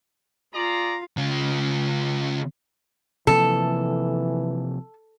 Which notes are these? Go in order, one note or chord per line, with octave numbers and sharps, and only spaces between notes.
F4 G#4 D5 F5 A#5
C#3 F4
C3 E3 F3 A#3 A4